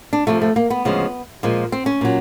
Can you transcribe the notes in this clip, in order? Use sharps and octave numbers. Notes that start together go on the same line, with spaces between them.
D4
F2 C3 F3 A3
A3
A#3
B3
D2 C#3 F3 G#3
A#2 F3 G#3
C4
C#4
A#2 F#3